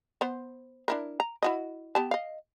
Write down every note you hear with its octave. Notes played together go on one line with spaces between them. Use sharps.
B3 C5
D4 E4 A#4
A#5
E4 F#4 D#5
B3 G4 A5
D#5 F5